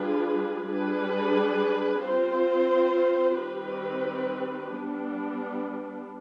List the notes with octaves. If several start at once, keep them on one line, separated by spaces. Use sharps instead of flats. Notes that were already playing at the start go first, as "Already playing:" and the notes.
Already playing: G3 D4 F4 G#4 B4
G3 D4 G#4 B4
C4 F4 C5
D#3 G3 C4 G4 B4
G3 B3 D4